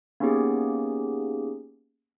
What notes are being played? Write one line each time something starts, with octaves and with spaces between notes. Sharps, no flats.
A#3 B3 C#4 D#4 G4 G#4